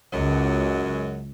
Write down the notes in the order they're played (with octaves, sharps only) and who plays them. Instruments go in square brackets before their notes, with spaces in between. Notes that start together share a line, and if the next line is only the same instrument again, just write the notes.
[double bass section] C#2 [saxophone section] F#2 F#3 G#3